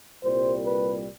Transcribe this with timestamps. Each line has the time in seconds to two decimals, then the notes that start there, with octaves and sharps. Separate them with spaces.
0.24 C2 A#2 G3 C5
0.65 B4